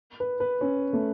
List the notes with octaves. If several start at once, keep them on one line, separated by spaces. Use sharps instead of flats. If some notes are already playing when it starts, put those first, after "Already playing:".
B4
B4
C#4
A3